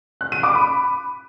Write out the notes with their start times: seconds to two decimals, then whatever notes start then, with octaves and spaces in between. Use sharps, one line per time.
0.21 F#6
0.32 D#7
0.43 D6
0.55 B5